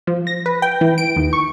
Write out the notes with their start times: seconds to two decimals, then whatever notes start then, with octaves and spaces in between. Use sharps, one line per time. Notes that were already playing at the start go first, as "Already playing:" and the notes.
0.07 F3
0.27 A#6
0.46 B4
0.62 G5
0.81 E3
0.98 D7
1.16 D#2
1.33 C#6